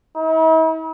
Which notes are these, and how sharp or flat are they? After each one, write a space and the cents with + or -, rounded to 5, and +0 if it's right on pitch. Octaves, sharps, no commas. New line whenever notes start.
E4 -45